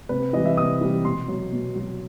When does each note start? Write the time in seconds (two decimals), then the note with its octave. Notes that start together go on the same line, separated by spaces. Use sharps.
0.09 C3 B4
0.33 E3 G3 D#5
0.46 E5
0.57 C3 D#6
0.81 E3 G3
1.05 B2 C6
1.28 F#3
1.52 B2
1.75 F#3